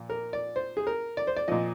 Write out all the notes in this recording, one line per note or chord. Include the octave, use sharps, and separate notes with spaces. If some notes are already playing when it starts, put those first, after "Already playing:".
Already playing: A#2 F3
A#4
D5
C5
G#4
A#4
D5
C5
D5
A#2 F3 D#5